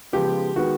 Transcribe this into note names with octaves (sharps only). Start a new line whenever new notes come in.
C#3 F3 G#3 B3 G4
D#3 G#3 B3 F#4